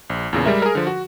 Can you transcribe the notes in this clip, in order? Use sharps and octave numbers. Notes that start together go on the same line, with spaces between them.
A#1
E2 A#2 C#3
G3 G#3 A#4 E5
G#4 A#4
D3 F3
F#4